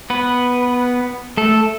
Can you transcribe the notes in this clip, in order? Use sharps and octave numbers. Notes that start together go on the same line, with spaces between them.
B3 B4
A3 A4